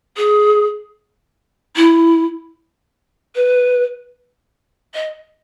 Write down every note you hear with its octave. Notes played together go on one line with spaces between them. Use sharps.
G#4
E4
B4
D#5